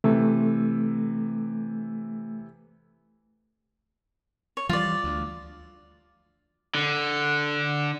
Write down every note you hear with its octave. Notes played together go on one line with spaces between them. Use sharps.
C3 E3 A3
C#5
E3 F3 G3 F4 D5
D2
D3